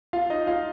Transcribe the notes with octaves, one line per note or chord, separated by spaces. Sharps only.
F4 F5
D#4 D#5
F4 F5